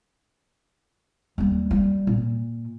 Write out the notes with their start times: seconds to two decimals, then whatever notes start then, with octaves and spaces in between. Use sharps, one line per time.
1.38 D#2 G3
1.71 G3
2.07 A#2